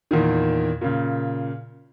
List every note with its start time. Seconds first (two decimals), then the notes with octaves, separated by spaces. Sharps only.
0.11 E2 A#2 D#3
0.81 A#2 C#3